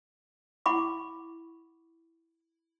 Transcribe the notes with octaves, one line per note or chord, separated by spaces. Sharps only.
E4 F#5 B5 C#6 D6